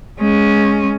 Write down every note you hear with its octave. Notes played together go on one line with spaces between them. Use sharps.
G#3 C#4